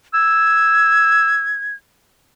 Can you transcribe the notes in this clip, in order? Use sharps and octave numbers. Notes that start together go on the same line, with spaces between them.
E6 G#6